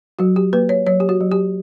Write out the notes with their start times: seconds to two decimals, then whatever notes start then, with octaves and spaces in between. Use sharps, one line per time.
0.19 F#3 F#4
0.36 G4
0.53 A#3 B4
0.69 C#5
0.87 F#3 C#5
1.00 G4
1.09 F#4
1.20 F#3
1.31 G4